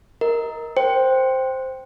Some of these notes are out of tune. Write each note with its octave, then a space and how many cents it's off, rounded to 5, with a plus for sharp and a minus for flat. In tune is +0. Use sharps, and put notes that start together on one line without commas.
A#4 +0 D#5 +25
C5 +0 G5 +0